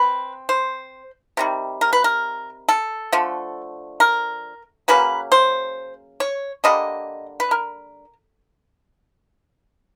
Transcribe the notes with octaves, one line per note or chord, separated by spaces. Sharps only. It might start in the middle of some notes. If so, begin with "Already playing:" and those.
Already playing: C4 B4
C5
C3 D#3 G3
A#4
B4
A#4
A4
D3 F3 A3
A#4
C#3 F#3 A#3 C#4 B4
C5
C#5
D3 G3 A#3 D#5
B4
A#4